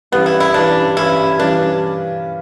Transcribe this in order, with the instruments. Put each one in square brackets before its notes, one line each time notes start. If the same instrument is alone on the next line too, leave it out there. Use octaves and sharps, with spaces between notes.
[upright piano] G2 E3 G3 C#4 [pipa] B3
[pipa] E4
E4
[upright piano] G2 E3 G3 C#4 [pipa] D4
[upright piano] G2 E3 G3 C#4 [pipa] E4
[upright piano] G2 E3 G3 C#4 [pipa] D4